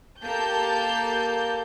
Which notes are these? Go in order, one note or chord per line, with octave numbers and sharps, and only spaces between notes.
A#3 G4 A4 A5 G6